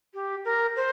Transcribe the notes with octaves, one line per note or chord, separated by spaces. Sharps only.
G4
A#4
C5